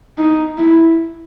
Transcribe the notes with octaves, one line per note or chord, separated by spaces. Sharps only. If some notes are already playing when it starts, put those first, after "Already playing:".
D#4
E4